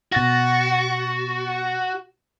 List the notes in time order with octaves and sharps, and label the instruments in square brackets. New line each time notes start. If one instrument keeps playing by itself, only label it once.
[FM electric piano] B2 A6 A#6 [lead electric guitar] F#4